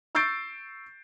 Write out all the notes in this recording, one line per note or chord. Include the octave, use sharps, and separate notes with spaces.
C#6 E6 G6 A6 C7 D7